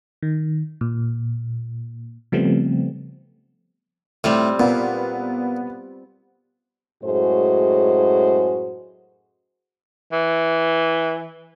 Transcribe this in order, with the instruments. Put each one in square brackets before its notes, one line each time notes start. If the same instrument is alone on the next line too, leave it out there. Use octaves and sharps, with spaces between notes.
[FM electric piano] D#3
A#2
C#3 F3 G3 A3 B3 C4
[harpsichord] A2 [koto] G3 C4 F4
[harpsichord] A#2 [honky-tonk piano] B3
[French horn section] F#2 A2 G#3 F#4 G#4 C5
[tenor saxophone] E3